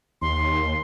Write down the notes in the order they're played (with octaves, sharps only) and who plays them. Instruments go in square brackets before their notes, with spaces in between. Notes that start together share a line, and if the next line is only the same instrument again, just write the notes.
[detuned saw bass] D#2 [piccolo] C6